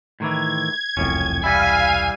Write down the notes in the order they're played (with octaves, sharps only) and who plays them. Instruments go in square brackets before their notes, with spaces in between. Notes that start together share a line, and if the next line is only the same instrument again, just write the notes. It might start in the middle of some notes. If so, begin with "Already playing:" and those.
[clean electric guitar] A2 D#3 E3 [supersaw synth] G#6
[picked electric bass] E1 C2 [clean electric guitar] F2 A2 C#4
[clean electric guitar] G3 E4 [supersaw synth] F5 D#7 [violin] G#5